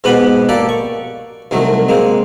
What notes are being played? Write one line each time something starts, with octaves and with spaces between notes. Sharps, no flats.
G#2 B2 B3 G4 B4 B5
A#3 G4 A4 D5
C#6
C2 D#3 F#3 A3
G#3 A#3 C4